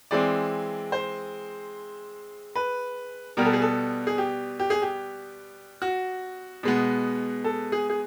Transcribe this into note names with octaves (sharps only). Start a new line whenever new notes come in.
E3 G#3 C4 D5
C5
B4
B2 G3 B3 A#4
A4
G#4
A4
G#4
G4
G4
G#4
G4
F#4
B2 G#3 B3
A4
G#4
G#4